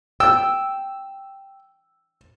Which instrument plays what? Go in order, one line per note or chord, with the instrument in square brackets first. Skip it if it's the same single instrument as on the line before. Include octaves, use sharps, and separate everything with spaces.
[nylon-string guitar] G5 [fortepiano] E6